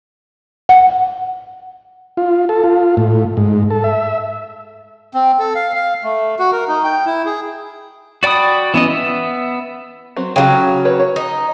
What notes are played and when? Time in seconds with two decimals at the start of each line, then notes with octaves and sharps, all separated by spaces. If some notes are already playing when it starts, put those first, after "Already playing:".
0.69 F#5
2.17 F4
2.49 A4
2.64 F4
2.97 A2
3.37 G#2
3.70 A4
3.84 E5
5.14 C4
5.39 A4
5.55 F5
5.75 F5
6.04 A3
6.39 F#4
6.52 A#4
6.68 D#4
6.84 G5
7.06 E4
7.26 G#4
8.23 F#4 D5 G5 B5 D#6
8.74 E3 B3 C#4 D#5
8.88 B3 E5
10.17 F#3 C4
10.36 C#3 F#3 G4 C#5 F5
10.85 B4 C#5
10.99 C#5
11.16 D#4